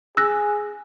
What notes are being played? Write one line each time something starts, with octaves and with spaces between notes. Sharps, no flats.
G#4 E6 F#6 A#6